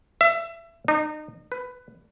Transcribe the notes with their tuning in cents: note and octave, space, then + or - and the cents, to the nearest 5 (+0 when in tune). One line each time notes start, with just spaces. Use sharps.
E5 +25
D#4 -30
B4 +15